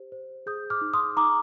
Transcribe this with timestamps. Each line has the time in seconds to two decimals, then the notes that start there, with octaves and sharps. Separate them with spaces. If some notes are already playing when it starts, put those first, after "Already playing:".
Already playing: G4 C5
0.12 C5
0.46 G#4 D#6 G6
0.70 D6 F6
0.81 D#4
0.94 C6 D#6
1.17 D#4 A#5 D6